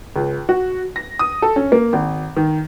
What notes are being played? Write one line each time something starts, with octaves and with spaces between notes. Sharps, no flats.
C#2
F#4
A#6
D#6
A4
C#4
A#3
G#1
D#3